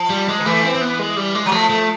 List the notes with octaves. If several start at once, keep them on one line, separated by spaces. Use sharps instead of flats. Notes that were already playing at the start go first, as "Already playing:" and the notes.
Already playing: F3
G3
G#3
D#3
E3 A3
C4
C4
B3
G#3
G3
G#3
F#3
F3 A3
A3